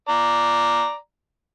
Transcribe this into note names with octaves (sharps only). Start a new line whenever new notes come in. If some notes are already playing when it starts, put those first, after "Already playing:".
D5 A#5